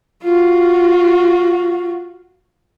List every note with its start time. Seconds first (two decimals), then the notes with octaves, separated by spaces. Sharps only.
0.24 F4 F#4